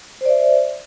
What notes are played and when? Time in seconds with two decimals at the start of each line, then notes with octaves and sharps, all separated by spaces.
0.21 C5
0.25 D5
0.30 E5